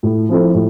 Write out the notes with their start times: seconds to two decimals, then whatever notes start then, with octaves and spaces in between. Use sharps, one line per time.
0.03 A2
0.29 F3 C4 E4 A4
0.54 A2